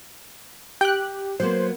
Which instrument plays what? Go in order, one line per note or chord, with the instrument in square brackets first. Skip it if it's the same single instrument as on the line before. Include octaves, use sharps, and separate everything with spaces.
[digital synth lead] G4 [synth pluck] G5 F#6
[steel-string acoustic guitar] F#3 A#3 B3 [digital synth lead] C5